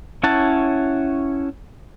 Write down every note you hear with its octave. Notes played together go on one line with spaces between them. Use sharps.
C#4 E4 C#5 F#5 A5